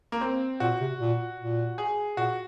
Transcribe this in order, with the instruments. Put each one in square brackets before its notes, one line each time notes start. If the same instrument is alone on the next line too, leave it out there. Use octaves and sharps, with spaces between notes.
[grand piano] A#3
C4
[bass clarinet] A#2 [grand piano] F#4
[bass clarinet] C3
A#2
A#2
[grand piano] G#4
[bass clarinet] A#2 [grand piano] F#4